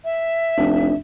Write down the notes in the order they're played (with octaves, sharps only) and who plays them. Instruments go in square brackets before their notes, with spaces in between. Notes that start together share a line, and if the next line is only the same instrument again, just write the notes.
[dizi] E5
[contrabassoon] F1 [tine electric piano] D4